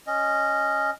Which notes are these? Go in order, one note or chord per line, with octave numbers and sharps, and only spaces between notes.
C#4 D#5